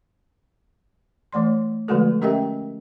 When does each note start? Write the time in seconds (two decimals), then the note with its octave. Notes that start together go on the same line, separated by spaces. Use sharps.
1.33 E3 A3 D5 C6
1.88 D3 F3 G#3 A3 F#4 A4
2.22 C#4 G4 A#4 D#5 E5 G5